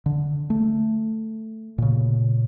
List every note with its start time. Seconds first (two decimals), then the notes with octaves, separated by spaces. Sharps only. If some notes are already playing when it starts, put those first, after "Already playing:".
0.06 D3
0.50 A3
1.78 A#2 C#3